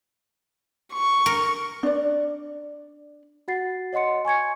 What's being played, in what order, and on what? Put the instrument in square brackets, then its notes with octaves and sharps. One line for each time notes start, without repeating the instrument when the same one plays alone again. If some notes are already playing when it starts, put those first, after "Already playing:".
[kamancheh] C#6
[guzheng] A#4
[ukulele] D4 D5
[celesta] F#4 F#5 A6 C7
C#5 D#5 F#5 C6 C#7
G#5 C#6 G#6 C#7